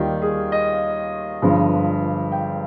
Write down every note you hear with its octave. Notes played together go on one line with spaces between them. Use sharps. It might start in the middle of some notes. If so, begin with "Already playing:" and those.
Already playing: D#2 D#3 G3 F4 G4
G#4
D#5
G1 G2 F3 G#3
G5